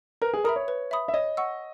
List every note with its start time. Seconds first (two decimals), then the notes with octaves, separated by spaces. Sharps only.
0.22 A#4 B4
0.33 G#4
0.44 A#4 E5 B5 D#6
0.56 C#5
0.68 B4
0.91 E5 B5 D#6
1.08 E5
1.14 C#5 D#5
1.37 F#5 C#6 E6